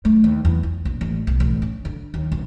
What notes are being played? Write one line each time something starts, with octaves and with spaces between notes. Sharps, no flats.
A3
D#2
E2
F4
A#1
A1
B1
A1
C#4
D3
D#2
A#1